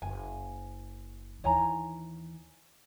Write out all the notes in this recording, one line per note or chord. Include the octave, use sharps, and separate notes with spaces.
F#1 G#5
D#2 E3 C#5 G#5 A#5